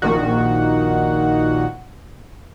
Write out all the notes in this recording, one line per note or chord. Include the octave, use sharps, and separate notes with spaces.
A#1 A#2 D#3 F#4